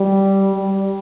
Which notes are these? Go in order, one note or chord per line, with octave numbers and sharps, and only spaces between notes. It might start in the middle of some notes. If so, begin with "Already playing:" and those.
Already playing: G3
G3